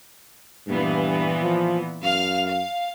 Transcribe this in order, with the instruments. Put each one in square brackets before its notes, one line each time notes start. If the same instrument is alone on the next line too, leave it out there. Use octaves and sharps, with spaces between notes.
[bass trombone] G2 [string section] A#2 E3 B3
[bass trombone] F3
[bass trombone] F#2 [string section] F5 F6
[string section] F5